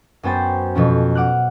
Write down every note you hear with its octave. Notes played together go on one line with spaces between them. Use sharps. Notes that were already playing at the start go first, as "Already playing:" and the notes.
F#2 B3 C5 G5 A6
F2 B2 F3 C#4
F#5 D6 F6 F#6